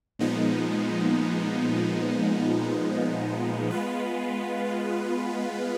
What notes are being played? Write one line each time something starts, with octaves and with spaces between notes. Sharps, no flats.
A#2 F3 G#3 B3 D#4
G#3 B3 F4 B4